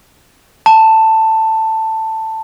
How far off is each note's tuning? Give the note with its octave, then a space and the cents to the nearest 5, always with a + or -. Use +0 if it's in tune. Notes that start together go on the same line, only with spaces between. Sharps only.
A5 +10